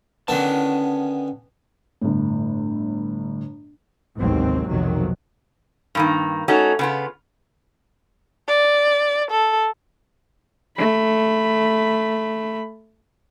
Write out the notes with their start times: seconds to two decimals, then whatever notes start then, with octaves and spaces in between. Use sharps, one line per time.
0.28 D3 D#3 B3 C#4 A5
2.02 G1 A2
4.17 A1 D#2 G#2 C3 F#3 C4
4.67 B1 F2 C3 D#3 F#3
5.95 G2 D#3 A#3
6.48 A3 C#4 D#4 F#4
6.79 C#3 B3 F4
8.49 D5
9.31 A4
10.78 A3 B5